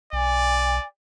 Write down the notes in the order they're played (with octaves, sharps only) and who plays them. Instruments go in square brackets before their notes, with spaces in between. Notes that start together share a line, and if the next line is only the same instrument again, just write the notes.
[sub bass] B1 [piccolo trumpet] D5 [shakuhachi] G#5